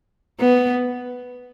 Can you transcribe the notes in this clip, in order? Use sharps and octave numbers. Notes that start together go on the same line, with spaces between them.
B3